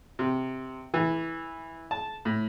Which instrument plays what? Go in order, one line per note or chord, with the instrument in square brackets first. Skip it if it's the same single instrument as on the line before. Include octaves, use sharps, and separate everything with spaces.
[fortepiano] C3
E3
A5
A2